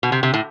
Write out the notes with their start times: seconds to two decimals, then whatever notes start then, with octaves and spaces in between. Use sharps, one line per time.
0.03 B2
0.12 C3
0.23 C3
0.34 A2